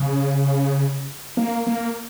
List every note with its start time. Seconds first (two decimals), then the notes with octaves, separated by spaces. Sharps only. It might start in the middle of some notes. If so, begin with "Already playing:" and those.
Already playing: C#3
1.37 A#3
1.67 A#3